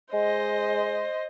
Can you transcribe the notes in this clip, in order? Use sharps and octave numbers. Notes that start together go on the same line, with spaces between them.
G#3 C5 D#5